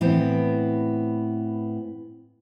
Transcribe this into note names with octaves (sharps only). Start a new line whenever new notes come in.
A2 E3 B3 C4